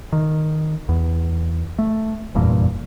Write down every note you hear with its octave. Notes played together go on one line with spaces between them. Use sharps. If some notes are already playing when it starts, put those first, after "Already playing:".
D#3
E2
A3
F1 E2 G2 A#2